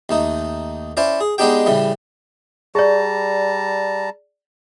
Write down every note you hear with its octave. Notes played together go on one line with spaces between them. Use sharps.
D#2 A3 D#4
C#4 E4 C5 D5
G#4
G#3 B3 D4 D#4 G4 G5
A2 C#3 E3 G3
G3 G#4 D5 A5 A#5